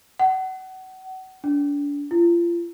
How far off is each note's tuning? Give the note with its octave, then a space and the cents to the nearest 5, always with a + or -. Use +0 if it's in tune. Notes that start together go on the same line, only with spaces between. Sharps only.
F#5 +30
D4 -35
F4 -30